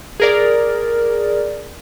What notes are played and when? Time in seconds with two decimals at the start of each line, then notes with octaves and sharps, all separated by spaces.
0.20 G#4 A#4 D5